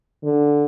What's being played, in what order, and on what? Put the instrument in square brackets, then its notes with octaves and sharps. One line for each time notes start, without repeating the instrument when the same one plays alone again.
[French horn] D3